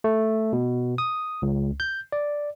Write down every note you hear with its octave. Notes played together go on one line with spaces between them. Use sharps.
A3
B2
D#6
C#2
G6
D5